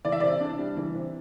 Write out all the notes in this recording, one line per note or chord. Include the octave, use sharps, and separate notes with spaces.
E3 D5
E5
C3 D5
D4
G3
E3
C3